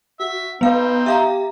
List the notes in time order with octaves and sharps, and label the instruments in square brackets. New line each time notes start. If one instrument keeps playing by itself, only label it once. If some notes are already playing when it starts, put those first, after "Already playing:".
[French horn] F#4 [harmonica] E5
[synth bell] B3 F5 [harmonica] C4 D#4 [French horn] B4
[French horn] G4 [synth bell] E5 F5 A#5